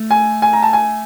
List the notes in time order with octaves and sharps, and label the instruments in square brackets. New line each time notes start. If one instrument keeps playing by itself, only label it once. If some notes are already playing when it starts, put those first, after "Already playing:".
Already playing: [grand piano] A3
[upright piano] G#5
G#5
A#5
A5
G#5